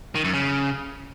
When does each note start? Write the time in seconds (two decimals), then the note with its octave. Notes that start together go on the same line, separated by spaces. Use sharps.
0.15 D#3
0.24 F#2
0.33 C#3